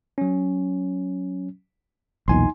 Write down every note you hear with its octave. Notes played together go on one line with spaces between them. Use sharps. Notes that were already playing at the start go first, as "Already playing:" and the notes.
F#3 C#4
B1 E2 A#2 D#4 G#5 C6